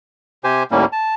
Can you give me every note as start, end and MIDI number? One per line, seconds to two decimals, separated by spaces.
0.44 0.63 48
0.44 0.63 67
0.44 0.63 72
0.44 0.63 80
0.71 0.85 39
0.71 0.85 45
0.71 0.85 55
0.71 0.85 58
0.71 0.85 61
0.92 1.15 81